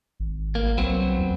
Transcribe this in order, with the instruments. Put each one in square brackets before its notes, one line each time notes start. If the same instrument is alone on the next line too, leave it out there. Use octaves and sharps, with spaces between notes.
[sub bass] G#1
[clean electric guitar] A#3
[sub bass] C2 [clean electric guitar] F#3 B3 C4
[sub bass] D#2